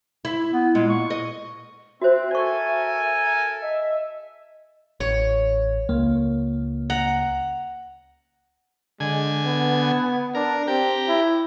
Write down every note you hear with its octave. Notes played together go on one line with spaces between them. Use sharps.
E4
B3
A#2 G#3
C#6
D#5
C4 F#4 C5 E5
A4 A#4 D5 G#5 C#6
D#5 E5
A1 C#5
C#2 A#3
F#5 A#5
D3 G#3 G#5
B3
D4 A#4
C4 G4 A#5
E4